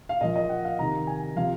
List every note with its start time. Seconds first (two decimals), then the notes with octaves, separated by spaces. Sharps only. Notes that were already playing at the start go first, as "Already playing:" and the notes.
0.09 F5
0.21 A#2 F3 D#5
0.36 D#5
0.49 F#5
0.65 F5
0.79 C3 D#3 A#5
1.07 G#5
1.36 C3 F3 F5